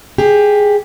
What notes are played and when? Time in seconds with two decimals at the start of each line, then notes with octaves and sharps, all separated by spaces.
0.18 G4 G#4